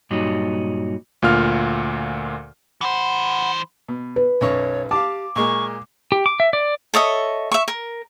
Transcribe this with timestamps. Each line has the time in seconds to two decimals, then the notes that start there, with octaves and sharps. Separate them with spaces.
0.10 G2 A#2 F#3 D#4
1.22 D2 A#2 F4 F6
2.81 E3 C5 F#5 B5
3.88 B2
4.16 B4
4.41 B1 F#2 C#5 C#6
4.91 G4 F5 A5 D6
5.36 A#2 G#3 A#3 C#6
6.12 G4
6.26 D6
6.40 E5
6.53 D5
6.94 A4 C#5 D#5 E5
7.52 E5 C#6
7.68 A#4